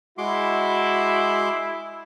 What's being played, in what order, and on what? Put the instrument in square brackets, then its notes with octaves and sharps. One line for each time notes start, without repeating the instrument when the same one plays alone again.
[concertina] G#3 C6 D6 [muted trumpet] E4 [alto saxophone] F#4